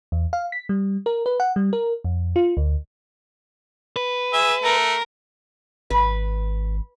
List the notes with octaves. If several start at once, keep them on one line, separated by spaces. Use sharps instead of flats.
E2
F5
B6
G3
A#4
B4
F#5
G3
A#4
F2
F4
D2
B4
G#4 E5
A3 A#4
G#1 B4